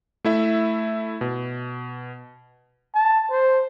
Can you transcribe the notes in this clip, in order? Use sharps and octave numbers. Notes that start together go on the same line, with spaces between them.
A3 E4 E5
B2
A5
C5